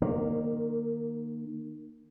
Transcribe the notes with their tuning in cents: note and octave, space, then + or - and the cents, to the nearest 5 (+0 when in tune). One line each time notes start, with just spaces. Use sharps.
D#3 -30 A#3 +0